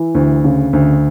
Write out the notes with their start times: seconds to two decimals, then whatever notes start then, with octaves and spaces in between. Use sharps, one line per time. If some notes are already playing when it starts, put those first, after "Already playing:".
Already playing: E3
0.15 D2
0.44 C#3
0.73 D2